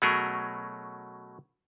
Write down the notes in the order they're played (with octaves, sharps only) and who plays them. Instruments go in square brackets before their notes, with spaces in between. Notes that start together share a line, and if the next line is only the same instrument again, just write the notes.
[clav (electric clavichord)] B2 F#3 A3 C#4 G#4 A#4